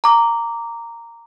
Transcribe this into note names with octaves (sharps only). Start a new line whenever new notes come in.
A#5 D6